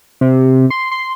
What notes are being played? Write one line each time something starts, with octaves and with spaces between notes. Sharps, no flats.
C3
C6
C6